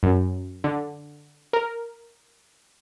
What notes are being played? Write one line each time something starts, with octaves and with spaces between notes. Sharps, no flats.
F#2
D3
A#4